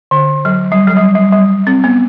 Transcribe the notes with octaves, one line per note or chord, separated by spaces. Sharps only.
D3
F#3
G3
F#3
G3
G3
G3
C4
B3